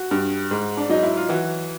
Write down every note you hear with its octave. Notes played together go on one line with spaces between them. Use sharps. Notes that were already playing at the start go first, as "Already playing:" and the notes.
Already playing: F#4
G2
G#2
D4
F#3 D#4
E4
F4
E3 F#4